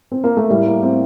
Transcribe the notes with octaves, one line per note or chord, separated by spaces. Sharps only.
C4
A#3
A3
A2 G3
A#3
A2 C4